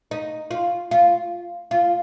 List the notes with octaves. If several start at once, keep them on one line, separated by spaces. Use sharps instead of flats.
D#4
F4
F4
F4